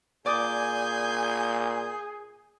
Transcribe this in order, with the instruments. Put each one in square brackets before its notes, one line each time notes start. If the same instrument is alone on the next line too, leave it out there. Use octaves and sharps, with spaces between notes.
[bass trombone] A#2 [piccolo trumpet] G#4 [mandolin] D5 D6 D#6 [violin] G#5 G6